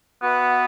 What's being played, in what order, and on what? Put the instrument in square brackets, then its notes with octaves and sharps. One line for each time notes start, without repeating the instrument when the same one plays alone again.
[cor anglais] B3 [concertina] F#4 B4 E5